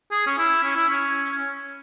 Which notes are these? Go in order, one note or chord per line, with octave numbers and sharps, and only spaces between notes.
G#4
C#4
E4
C#4
E4
C#4